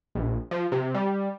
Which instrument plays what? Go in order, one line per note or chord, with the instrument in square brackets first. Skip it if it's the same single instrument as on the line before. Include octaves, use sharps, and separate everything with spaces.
[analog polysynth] A#1
F3
C3
G3